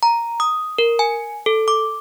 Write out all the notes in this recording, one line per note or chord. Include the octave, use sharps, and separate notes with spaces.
A#5
D#6
A#4
G#5
A4
D6